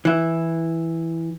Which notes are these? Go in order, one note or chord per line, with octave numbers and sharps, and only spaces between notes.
E3 E4